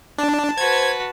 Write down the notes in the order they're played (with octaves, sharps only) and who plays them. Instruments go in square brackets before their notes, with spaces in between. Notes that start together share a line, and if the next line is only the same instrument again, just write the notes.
[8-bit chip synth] D4 [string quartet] A5
[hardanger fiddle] F#4 B4 [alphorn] C5 [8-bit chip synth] G#6